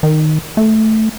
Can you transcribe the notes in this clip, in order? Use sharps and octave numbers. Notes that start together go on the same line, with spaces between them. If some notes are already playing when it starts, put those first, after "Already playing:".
D#3
A3